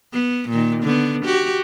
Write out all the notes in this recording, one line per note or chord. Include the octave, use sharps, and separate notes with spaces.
B3
A#2 D#3
D3 B3
F#4 G4